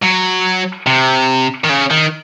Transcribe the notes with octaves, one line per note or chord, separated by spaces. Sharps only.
F#3
C3
D#3
C#3
D#3